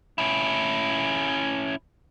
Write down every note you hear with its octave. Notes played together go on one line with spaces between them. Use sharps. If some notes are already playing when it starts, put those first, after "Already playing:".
C#4 E4